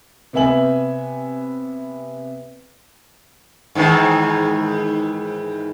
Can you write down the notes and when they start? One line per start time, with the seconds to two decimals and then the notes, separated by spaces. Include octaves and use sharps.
0.33 C3 B3 B4 E5 G#5 F#7
3.75 G#2 D#3 E3